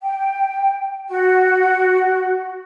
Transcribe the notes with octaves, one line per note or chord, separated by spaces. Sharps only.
G5
F#4